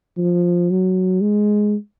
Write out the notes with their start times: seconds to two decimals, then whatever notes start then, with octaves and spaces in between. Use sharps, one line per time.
0.18 F3
0.70 F#3
1.21 G#3